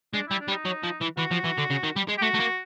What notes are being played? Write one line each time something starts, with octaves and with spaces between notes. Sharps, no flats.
G#3 D4
G3 E4
D4
G3
D#4
F#3
F3
E3
E3 F#4
F3
E3
D3
C#3
D#3
G3
G#3
G4
A3 F#4
A3
A#3